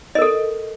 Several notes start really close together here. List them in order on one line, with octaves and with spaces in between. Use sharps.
D#5 A#4 A4